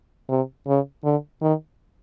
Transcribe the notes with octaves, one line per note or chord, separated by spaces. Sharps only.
C3
C#3
D3
D#3